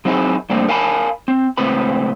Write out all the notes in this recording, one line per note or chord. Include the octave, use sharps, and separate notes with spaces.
F#3 C4 D#4 E4 G4 G#4
G2 A3 A#3 C4 D4
A#4 F5 G#5 A5 B5
C4
C#2 A2 C4 B4 B5